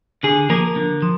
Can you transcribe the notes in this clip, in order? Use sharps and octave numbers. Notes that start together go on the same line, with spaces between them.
D3 G#4
F3 A#3 A#4
D3
F3